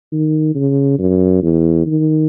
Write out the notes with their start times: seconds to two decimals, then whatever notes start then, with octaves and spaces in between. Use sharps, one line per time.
0.12 D#3
0.55 C#3
0.99 F#2
1.42 E2
1.86 D#3